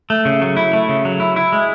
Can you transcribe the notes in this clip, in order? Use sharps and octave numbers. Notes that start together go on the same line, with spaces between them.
A3
C#3
F#3
E4
A3
C#3
F#3
E4
E4
G#3